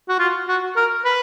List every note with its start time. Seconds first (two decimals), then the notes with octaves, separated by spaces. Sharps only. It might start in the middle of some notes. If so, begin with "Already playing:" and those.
0.09 F#4
0.19 F4
0.48 F#4
0.77 A#4
1.05 B4